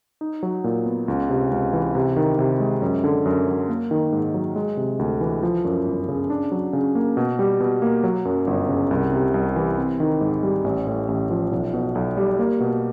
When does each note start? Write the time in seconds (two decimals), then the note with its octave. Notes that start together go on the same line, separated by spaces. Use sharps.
0.21 D#4
0.43 F#3
0.64 A#2
0.86 B3
1.08 C#2
1.30 C3
1.51 C#2
1.73 E3
1.95 C3
2.16 D#3
2.39 C3
2.60 G#3
2.82 F#2
3.04 D3
3.25 F#2
3.47 F#3
3.69 A#3
3.91 D#3
4.12 G#2
4.34 F#3
4.56 G#3
4.77 C3
4.99 D2
5.21 E3
5.43 F3
5.65 F#2
5.86 G1
6.08 C#3
6.30 D4
6.52 F#3
6.73 C#3
6.95 A#3
7.17 B2
7.39 G3
7.60 B2
7.82 A#3
8.04 F#3
8.25 F#2
8.47 G1
8.69 C#3
8.91 C2
9.12 C3
9.34 C2
9.56 E3
9.78 C4
10.00 D#3
10.21 G#2
10.43 G3
10.64 A1
10.87 A2
11.08 A1
11.30 F3
11.52 B1
11.74 B2
11.95 B1
12.17 G3
12.39 A#3
12.60 B2